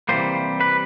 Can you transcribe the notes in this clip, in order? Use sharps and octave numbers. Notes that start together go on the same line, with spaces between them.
C3 E3 G3 A#3 C5
B4